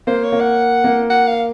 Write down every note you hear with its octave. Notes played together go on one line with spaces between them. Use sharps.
A#3 C5
C#5
A#3
F#5
A#3
F#5
F5